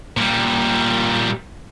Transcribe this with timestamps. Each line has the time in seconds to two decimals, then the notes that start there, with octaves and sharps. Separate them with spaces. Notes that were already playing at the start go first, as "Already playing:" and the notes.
0.17 A#2 G3